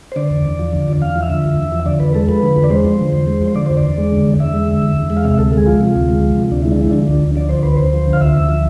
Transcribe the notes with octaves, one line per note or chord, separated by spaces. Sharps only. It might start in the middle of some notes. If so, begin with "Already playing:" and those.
C5
D3 D5
E2
E2
F3
D3
E2
E2 F5
F3
E5
D3
E2
E2
F3
D3 D5
E2 B4
G#3 A4
F3 B4
D3
E2
D5
G#3 C5
F3
D3
E2
G#3
F3
D3 D5
E2 C5
D5
E2
G#3
D3
E2
E2 E5
G#3
D3
E2
E2
G#3
F5
C3 E5
D2 A4
G#3 G#4
F3 F4
C3
D2
G#3
F3
C3
D2 D4
G#3 E4
D4
F3 E4
D3 D4
D2
D2
F3 D5
D3 C5
D2 B4
D2 C5
F3
D3
F5
D2 E5
D2
F3